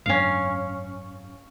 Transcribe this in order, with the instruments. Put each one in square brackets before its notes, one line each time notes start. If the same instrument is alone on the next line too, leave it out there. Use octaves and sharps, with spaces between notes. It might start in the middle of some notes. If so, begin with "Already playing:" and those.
[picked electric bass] G#1 F#2 D4 [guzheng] C#4 F5